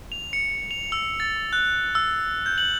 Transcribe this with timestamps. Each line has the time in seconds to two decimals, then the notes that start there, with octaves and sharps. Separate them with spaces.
0.12 F7
0.33 C#7
0.71 F7
0.92 E6
1.20 A6
1.53 F#6
1.95 E6
2.46 G6
2.58 F#7